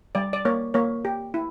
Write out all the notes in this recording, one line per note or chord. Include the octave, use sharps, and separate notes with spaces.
G3 D5
D5
A#3 C#5
A#3 C#5
G4
E4